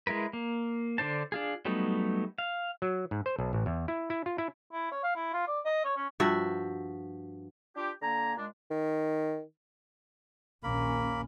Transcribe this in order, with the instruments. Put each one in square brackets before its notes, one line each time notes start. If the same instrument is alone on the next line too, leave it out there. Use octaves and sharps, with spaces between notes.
[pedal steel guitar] G#3 E4 A#4 B4
A#3
D3 D4 C5 A5
D4 F4 G#4
F#3 G3 A3 B3 D#4
F5
[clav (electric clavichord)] F#3
G#2
C5
B1
A1
E2
E4
E4
F4
E4
[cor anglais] E4
C#5
F5
E4
F4
D5
D#5
C#5
C#4
[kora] G2 F3 F#4 E5
[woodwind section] D4 F4 G4
D3 A#3 G#5 A#5
A#2 G#3 D4
[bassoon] D#3
[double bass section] A#1 D#2 C#4 [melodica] A#3 A#4 B5